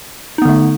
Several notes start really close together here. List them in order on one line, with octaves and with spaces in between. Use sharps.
D#4 B3 D3 A3